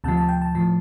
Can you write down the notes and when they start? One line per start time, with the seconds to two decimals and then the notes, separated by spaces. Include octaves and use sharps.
0.04 D2 C3 F3 A5
0.17 A5
0.29 G5
0.42 A5
0.55 A2 F3 A5